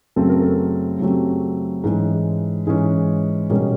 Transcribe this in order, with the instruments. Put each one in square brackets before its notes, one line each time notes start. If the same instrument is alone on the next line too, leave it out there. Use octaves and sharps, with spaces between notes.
[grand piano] F#2 C#3 F#3 A3 C4 A4
A#4
A4
F#2 C#3 F#3 A3 C4 G4
G#2 E3 G#3 C#4
G#2 E3 G#3 C#4 G#4
B2 G3 A#3 C#4 G#4